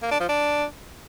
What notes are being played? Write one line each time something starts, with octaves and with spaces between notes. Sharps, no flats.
A#3
D4
F3
D4